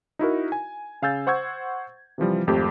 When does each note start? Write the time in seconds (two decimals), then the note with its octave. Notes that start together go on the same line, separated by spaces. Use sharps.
0.19 D#4 E4 F#4 A#4
0.52 G#5
1.02 C#3 F5 G#5 E6 G6 A6
1.27 C5 F#5 C#6 E6 G#6
2.18 C3 E3 F3 G3
2.47 G#1 F2 A3 G4